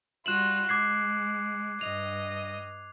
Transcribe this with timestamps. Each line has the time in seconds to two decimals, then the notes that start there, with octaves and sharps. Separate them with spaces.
0.26 G3 F4 F#4 F#6 E7 F#7
0.69 G#3 D6 G#6 C7
1.81 G2 D#5 F7